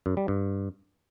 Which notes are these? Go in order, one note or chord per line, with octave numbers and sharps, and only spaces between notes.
F#2
G3
G2